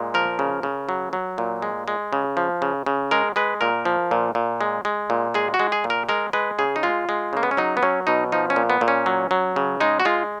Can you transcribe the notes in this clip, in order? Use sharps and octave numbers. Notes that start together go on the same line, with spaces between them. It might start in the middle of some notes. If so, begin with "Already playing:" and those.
Already playing: A#2 G#3
F3 A#4
C#3
C#3
F#3
F#3
A#2
G#3
G#3
C#3
F3
C#3
C#3
G#3 A#4
G#3 B4
A#2 A#4
F3
A#2
A#2
G#3
G#3
A#2
G#3 G#4
F#4
G#3
G#4
A#2
A#4
G#3 A#4
G#3 B4
C#3 G#4
D#4
G#3 F4
G#3
C#3 A#3
B3
C#4
F#3 D#4
B3
F#3 C#4
B2 D#4
F3 D#4
C#4
A#2
B3
A#2
C#4
F#3
F#3
C#3
G#3 D#4
F#4
G#3 F4